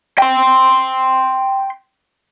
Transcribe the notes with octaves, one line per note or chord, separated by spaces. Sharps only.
G5 C6